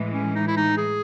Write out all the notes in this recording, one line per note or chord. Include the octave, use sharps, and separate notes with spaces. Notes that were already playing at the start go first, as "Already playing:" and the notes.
Already playing: A2 E3 G#3
C#4
D#4
E4
D#4
G#4